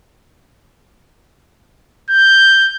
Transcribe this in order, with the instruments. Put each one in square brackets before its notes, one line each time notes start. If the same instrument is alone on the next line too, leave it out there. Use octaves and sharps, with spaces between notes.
[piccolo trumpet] G6